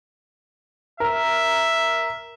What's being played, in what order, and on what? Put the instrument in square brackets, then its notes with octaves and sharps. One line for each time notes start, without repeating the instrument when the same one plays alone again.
[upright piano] A#4 [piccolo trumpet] E5